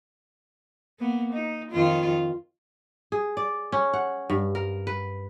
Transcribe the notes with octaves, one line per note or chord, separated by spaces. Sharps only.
A#3 B3
D#4
F2 D#3 F4
G#4
D5
C#4
F#5
G2
A#4
B4